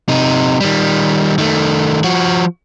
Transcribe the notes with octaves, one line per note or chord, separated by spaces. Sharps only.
C3 D#4
D#3 G3
D#3 A3
F3 F#4